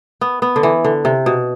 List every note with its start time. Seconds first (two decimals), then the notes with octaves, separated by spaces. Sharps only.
0.21 B3
0.42 B3
0.56 D3
0.63 E3
0.85 D3
1.05 C3
1.26 B2